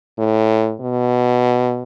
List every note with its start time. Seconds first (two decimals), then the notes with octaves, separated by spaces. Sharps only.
0.18 A2
0.81 B2